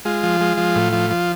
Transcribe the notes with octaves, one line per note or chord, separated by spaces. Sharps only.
G#3 F4
F3
G#3
F3
A2
F3
F3